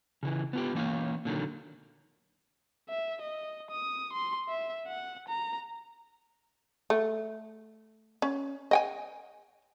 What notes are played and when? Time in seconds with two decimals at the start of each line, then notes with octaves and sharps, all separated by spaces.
0.23 C#3 E3
0.53 B3 F4 G4
0.75 E3 A#3 C#4 F5
1.25 A#2 D3 D#3 F#3
2.89 E5
3.22 D#5
3.71 D#6
4.13 C6
4.49 E5
4.87 F#5
5.29 A#5
6.90 A3
8.22 C#4
8.71 D#5 G5 G#5